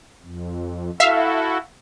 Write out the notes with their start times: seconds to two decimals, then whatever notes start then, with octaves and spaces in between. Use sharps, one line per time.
0.23 F2
1.00 E4 F#4 A4 E5 F5